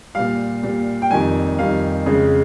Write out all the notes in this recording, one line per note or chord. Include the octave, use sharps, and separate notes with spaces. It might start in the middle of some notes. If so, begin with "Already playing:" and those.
A#2 G3 F5
A#2 G3
G5
F2 D#3 G3 G#5
F2 D#3 G3 F5
F2 C#3 G#3